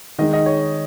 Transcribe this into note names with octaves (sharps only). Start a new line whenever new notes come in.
D#3 G#3 D#4 D#5
D#5
C#5